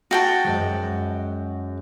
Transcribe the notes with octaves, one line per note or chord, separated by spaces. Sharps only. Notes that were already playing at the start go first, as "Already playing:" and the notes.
F#4 G5 A5
F#2 G#3